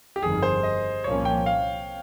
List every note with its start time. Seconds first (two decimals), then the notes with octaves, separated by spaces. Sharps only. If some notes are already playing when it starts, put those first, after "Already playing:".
0.16 G4
0.22 G1 F2 D#3 G#4
0.43 C5
0.63 D#5
1.04 C2 A#2 F3 A#3 C#4 C#5
1.25 G5
1.46 F5